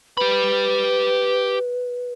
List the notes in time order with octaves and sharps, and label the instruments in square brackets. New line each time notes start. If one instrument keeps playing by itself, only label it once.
[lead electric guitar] G4 B5 [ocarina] B4